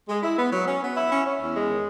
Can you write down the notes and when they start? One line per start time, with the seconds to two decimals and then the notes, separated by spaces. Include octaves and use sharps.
0.09 G#3
0.23 E4
0.38 B3
0.52 F#3
0.67 C#4
0.81 B3
0.95 E4
1.11 C#4
1.26 C#4
1.40 E2
1.54 G#3
1.69 D#3